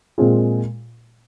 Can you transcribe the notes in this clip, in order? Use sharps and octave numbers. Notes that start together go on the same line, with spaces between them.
A#2 G#3 C4 F4 G#4